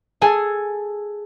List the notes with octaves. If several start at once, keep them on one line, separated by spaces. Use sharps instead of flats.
G#4 A4 G#5